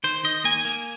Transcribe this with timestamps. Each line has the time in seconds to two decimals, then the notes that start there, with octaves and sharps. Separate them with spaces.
0.04 D#3 C5
0.24 D#3 D#5
0.44 A#3 G#5
0.65 A#3